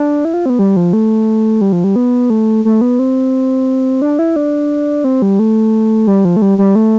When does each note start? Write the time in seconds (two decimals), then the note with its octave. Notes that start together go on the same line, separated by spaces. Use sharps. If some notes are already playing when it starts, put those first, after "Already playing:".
Already playing: D4
0.25 E4
0.34 F4
0.46 C4
0.50 B3
0.59 G3
0.77 F3
0.93 A3
1.61 G3
1.72 F3
1.84 G3
1.96 B3
2.30 A3
2.65 A3
2.81 B3
2.99 C4
4.02 D4
4.19 E4
4.36 D4
5.04 C4
5.22 G3
5.39 A3
6.07 G3
6.25 F3
6.36 A3
6.42 G3
6.58 G3
6.75 A3